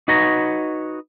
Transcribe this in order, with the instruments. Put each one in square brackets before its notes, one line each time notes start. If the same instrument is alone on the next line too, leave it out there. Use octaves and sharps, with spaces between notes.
[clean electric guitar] D#4 F#4 B4 C#5 A#5